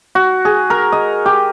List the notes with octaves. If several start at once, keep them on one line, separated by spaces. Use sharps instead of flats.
F#4
G#4
A#4
D#5
G4